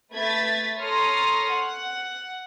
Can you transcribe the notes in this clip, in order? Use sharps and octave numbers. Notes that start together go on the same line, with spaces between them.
A3 B4 G#6 A6 B6
A4 C#5 A#5 C6 D#6 F6
F#5